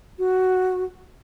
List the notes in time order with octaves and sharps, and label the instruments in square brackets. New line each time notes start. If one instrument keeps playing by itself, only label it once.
[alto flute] F#4